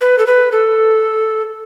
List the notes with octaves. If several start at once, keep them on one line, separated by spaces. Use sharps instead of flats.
B4
A4
B4
A4